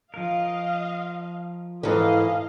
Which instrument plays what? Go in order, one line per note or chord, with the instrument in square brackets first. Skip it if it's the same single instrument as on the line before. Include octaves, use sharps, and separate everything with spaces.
[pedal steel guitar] F3 A#4 [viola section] D#5 F5
[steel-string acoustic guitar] G#2 E3 [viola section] E4 D#5 F5 [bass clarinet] A4